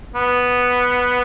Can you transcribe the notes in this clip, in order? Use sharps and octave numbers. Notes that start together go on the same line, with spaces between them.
B3